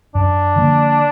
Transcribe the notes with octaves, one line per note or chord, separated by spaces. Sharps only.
F#2 D4
D3 F3 A#3